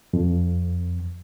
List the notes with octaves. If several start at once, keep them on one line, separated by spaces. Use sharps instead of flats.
F2